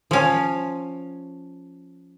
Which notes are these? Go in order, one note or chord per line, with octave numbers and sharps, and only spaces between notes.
F3 C#4